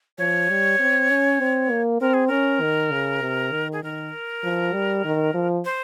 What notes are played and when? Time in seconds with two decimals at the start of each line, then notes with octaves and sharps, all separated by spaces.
0.18 F3 C#5
0.49 G3
0.80 C4
1.10 C#4
1.40 C4
1.70 A#3
2.00 C4 A#4
2.14 G#4
2.27 C#4 A#4
2.61 D#3
2.91 C#3
3.22 C3
3.52 D#3
3.73 G#4
3.83 D#3 A#4
4.44 F3
4.73 G3
5.05 D#3
5.34 F3
5.65 C5